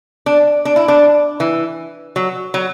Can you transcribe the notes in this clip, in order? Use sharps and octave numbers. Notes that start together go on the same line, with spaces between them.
D4
D4
E4
D4
E3
F#3
F#3